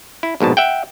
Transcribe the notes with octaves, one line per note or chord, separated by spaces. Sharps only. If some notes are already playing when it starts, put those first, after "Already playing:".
E4
A#1 G#2 B2 A5
E5 F#5 G5